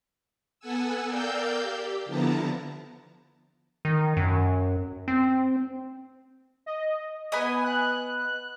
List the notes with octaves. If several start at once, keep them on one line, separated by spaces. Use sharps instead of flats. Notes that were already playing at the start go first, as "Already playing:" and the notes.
B3 A4 F#5 G#5 E6
A#4 D5 F5 G5 E6 G6
G4
D3 F3 B3 E4 A5 A#5
D#3
F#2
C4
D#5
B3 D#5 G#5
F#6